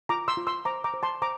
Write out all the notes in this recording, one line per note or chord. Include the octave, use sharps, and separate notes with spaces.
F4 A#5 D6
C6 E6
F4
C6 E6
C5 A#5 D6
A#5 D6
C5
A5 C6
C5 A#5 D6